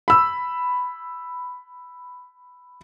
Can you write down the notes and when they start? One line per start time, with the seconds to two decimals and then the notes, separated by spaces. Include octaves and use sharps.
0.08 B5 E6